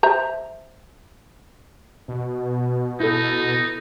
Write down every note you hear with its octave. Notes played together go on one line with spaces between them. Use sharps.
C5 E5 A#5
B2
D#4 E4 A4